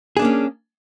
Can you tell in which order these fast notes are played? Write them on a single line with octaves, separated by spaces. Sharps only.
G#4 D4 A#3 C#4